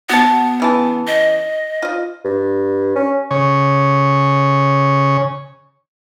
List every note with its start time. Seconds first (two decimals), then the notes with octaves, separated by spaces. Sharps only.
0.09 B3 F#4 A5
0.60 C#3 E3 A5
1.07 D#5
1.82 F4 D#5
2.25 G2
2.96 C#4
3.31 C#3 C#5